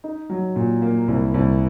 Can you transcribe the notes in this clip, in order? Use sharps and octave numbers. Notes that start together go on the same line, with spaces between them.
D#4
F#3
A#2
A#3
C2
C2